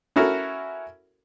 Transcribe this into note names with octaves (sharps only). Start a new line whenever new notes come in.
C#4 E4 F#4 A4 A#4